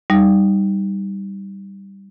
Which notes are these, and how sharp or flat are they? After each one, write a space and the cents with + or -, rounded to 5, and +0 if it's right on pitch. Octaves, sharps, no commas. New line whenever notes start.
G3 +0 D#4 +0